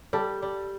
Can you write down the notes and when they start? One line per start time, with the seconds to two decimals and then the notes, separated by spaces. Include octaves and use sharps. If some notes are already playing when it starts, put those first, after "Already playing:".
0.13 G3 A4
0.42 G3